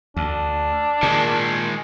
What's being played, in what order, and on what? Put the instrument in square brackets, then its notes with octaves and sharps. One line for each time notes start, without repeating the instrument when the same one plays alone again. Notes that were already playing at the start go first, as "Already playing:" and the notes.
[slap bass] D2 [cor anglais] D4
[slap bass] A#2 [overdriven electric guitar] D#3 G#3